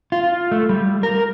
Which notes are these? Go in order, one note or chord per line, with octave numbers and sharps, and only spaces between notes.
F4
A3
G3
A#4